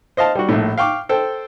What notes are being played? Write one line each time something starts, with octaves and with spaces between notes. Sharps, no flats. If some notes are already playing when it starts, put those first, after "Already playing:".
C5 D#5 F5 A5
G3 F#4
A#1 A2
F5 G5 C#6 D6
A4 C5 G5